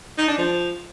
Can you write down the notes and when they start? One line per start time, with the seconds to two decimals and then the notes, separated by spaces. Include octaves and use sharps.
0.18 D#4
0.28 D4
0.38 F3